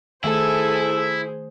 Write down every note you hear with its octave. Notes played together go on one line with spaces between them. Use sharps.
D#3 A3 E4 G#4 A4 C5 G#5